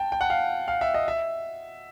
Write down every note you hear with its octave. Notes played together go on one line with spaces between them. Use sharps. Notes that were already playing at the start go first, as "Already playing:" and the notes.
Already playing: G5 A5
G5
F#5
F5
F5
E5
D#5
E5